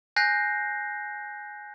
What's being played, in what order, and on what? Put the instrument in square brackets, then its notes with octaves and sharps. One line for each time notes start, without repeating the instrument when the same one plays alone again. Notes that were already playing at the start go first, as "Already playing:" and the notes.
[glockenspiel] G#5 F#6 G6 A#6 C7